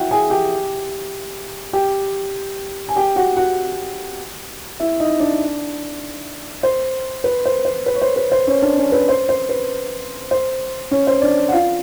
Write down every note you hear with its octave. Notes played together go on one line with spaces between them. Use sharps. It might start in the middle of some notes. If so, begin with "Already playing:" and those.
Already playing: E4 F#4 E5 F#5 G5
G#4 G#5
G4 G5
G4 G5
G#5
G4 G5
F#4 F#5
F#4 F#5
E4 E5
D#4 D#5
D4 D5
C5
B4
C5
C5
B4
C#5
C5
B4
C5
C#4 C#5
D4 D5
C#4 C#5
B4
C5
C5
B4
C5
C#4 C#5
C5
D4 D5
F#5
F4 F5